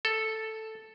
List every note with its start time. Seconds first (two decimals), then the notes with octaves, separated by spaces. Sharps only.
0.05 A4